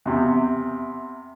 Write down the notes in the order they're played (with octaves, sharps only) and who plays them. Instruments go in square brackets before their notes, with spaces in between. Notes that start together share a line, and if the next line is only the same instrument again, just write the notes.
[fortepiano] E2 C3